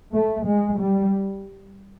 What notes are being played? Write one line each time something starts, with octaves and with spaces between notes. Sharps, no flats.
A3
G#3
G3